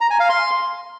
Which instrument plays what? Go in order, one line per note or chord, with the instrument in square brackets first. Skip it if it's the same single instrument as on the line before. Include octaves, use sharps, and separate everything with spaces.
[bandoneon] A#5
G#5
F5
C6